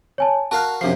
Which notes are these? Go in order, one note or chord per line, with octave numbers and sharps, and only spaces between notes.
C#5 G#5 A5
F#4 A#4 F5 A5 F#6
F#2 C3 F3 D4 C7